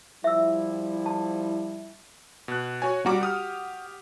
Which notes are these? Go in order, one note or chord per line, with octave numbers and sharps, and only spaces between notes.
F3 G3 E4 E5 E6
A5
B2 F#6
F#4 C#5 G#5
G3 F#4 A#5 D6
G4 D#6 F6